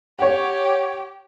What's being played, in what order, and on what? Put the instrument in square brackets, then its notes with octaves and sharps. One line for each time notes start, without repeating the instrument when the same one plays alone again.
[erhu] G4 [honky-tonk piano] C#5 F#5